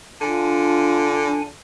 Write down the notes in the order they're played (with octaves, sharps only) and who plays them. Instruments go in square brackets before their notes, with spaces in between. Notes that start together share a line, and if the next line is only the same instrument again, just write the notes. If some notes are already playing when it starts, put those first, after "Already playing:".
[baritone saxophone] D3 [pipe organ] D4 G#5 [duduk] F4